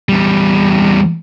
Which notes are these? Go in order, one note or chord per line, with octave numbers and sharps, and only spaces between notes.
E2 G3